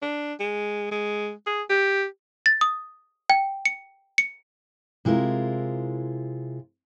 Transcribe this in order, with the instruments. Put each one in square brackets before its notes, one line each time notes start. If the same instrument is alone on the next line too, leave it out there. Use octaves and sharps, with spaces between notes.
[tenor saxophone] D4
G#3
G#3
G#4
G4
[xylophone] A6
D#6
G5
C#7
C#7
[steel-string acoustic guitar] C3 G#3 E4 F4 A#4